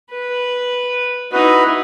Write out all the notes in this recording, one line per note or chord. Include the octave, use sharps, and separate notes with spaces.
B4
D#4 E4 F#4 B4